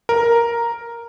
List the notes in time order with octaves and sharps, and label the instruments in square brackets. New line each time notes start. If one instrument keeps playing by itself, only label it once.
[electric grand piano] A#4